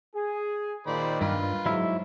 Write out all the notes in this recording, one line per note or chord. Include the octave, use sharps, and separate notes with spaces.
G#4
A#2 D#3 C5 D5 B5
G2 F4 B4
G#2 F#3 E4